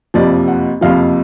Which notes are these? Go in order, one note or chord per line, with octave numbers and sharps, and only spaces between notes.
F#1 F2 C3 F3 D5
F#5
F#1 F2 C3 F3 F5